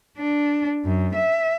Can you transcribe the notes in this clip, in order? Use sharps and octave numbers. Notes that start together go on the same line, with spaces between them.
D4
F#2
E5